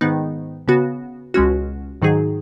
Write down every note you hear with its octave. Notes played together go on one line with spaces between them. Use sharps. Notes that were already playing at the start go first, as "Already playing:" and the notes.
G#2 D#3 B3 D#4
C#3 B3 F#4
C#2 B2 G#3 C#4 F#4
G#2 D#3 F#3 D#4 G#4